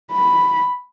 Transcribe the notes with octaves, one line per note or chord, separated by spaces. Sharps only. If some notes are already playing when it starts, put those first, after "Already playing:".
B5